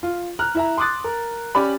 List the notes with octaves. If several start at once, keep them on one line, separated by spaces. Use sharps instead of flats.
F4
A#5 F6 F#6
E4 E5 A#5
C6 D6 D#6 F#6 A6
A#4
C#4 G4 D5 B5